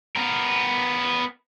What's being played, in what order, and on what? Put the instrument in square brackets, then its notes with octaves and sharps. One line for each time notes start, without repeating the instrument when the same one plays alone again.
[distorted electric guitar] B3 A#4